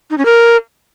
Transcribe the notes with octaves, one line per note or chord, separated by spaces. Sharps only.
D#4
C#4
A#4